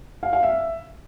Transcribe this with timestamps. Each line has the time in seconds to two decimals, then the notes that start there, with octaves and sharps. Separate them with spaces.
0.23 F5
0.33 F5
0.43 E5